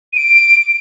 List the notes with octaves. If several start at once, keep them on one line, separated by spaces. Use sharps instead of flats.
D#7
D7